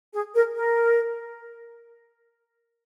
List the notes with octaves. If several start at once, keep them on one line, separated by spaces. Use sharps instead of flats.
G#4
A#4
A#4